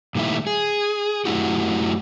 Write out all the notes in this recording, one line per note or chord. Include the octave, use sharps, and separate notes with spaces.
A#2 D#3 G3 A3 E4
G#4
F#2 A3 E4 F#4 G4